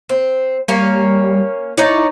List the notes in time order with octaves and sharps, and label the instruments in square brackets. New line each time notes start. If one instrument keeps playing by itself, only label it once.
[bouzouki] C4
[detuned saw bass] G3 [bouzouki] A#3 C#4
[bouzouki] D#4 C#5 D5 [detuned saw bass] E4